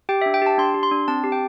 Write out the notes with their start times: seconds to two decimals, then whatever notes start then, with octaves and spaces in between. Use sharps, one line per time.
0.09 G4 G5
0.22 E5
0.26 D4
0.34 G5
0.42 G4 A5
0.58 D4 C6
0.74 G4
0.83 C6
0.91 D4
1.08 C4 A5
1.24 G4
1.32 G5